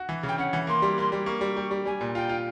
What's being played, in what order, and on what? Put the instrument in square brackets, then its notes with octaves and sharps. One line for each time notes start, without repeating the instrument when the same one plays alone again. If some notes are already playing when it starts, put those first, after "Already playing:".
Already playing: [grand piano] F#4
E3
[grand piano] C#3 [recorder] G5
[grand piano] C#4 [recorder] F#5
[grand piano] E3
[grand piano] A#3 [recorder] C6
[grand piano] G3
[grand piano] A#3 [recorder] C6
[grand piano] G3
[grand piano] A#3 [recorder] C#6
[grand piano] G3
G3
G3
[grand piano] G3 [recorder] G#5
[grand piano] A#2
[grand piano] F4 [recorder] G5
[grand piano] F4